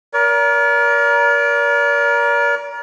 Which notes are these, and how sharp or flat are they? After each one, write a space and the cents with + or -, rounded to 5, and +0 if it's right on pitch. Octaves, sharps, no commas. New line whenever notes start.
A#4 +20 D5 -45